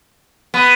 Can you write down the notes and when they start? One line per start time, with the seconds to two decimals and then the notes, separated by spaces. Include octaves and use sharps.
0.54 B3